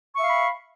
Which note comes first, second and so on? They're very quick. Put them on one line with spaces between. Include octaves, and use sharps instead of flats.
C#6 E5 F5 B5